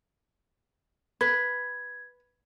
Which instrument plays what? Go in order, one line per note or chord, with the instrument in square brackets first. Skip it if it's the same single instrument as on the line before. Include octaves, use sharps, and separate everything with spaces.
[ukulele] B4 [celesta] G#6